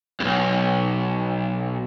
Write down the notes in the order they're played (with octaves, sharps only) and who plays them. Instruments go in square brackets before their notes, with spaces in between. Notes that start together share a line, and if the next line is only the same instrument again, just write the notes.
[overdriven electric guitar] B1 E2